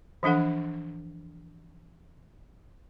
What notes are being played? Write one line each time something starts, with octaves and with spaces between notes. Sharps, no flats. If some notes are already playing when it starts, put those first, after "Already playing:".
E3 F3 D4 A4 F#5